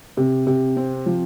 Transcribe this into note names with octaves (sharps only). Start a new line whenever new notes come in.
C3
C3
C4
F3